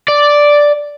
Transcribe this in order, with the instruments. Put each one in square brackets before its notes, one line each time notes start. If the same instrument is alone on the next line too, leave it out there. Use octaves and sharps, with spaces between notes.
[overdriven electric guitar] D5